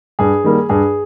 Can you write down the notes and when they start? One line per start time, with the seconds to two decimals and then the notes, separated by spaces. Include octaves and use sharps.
0.19 G2 G#4
0.44 D#3 G3 A#3
0.69 G2 G#4